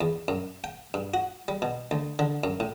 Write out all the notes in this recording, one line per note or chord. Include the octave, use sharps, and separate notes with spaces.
E2
F#2
G5
G2
F#4
G3
B2
D2
D3
F#2
A2